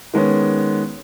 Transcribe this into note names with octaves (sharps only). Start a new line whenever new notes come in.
D#3 G#3 B3 C#4